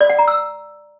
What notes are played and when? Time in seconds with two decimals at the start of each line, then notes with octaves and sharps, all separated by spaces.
0.01 D5
0.10 F#5
0.19 A#5
0.28 E6